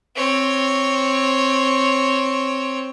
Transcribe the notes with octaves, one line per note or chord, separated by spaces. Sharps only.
C4 C#5